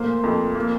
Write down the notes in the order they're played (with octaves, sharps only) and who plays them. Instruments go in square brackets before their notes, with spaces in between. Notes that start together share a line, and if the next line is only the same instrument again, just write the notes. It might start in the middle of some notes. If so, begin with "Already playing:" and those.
Already playing: [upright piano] A#2 A3 A#3 C5
F2
A#3